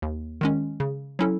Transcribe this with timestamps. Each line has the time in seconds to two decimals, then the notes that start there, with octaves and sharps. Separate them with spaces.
0.02 D#2
0.41 D#3 G#3 C#4
0.80 C#3
1.19 F#3 C#4 E4 A4